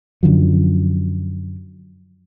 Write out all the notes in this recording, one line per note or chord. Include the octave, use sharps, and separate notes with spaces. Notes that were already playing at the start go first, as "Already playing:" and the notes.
F#2 D3 F3 F#3